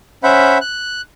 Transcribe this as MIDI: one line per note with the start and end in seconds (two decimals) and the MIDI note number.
0.24 0.58 61
0.24 0.58 72
0.24 0.58 76
0.24 0.58 78
0.24 0.58 83
0.61 1.01 90